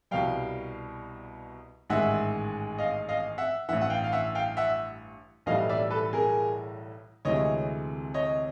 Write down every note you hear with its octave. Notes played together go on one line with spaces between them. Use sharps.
C2 B2 G3 F5 G5
A1 G#2 D#3 G#3 E5 F#5
D#5 F5
D#5 F5
E5 F#5
A1 G2 E3 E5 F#5
F#5
F5 G5
F5
E5 F#5
F5 G5
E5 F#5
B1 A2 E3 G3 D#5 F5
D5 E5
A4 B4
G#4 A#4
D2 C3 E3 G#3 C#5 D#5
C#5 D#5